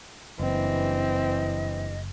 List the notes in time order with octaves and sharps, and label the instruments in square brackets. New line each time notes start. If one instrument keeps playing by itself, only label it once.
[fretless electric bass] F#1 [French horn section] G2 E3 [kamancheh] C4 [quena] D#5